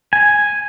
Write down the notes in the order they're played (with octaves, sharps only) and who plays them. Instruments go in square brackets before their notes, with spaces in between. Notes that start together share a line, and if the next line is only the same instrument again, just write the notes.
[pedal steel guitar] G#5